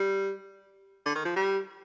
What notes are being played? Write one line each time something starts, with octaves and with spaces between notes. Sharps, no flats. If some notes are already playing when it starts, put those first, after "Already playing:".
Already playing: G3
D3
D#3
F3
G3